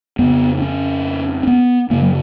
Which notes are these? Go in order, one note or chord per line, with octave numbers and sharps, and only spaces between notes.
F2 C#3 B3
C#4
C#4
B3
F#2 C#3 A#3
F#3